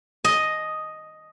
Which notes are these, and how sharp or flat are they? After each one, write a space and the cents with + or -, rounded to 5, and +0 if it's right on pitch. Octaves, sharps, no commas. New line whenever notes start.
D#5 +0 A5 -45